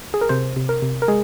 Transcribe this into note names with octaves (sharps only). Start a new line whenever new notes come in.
G#4
A#4
C3 C5
C3
A#4
C3
A#4
G#3 G#4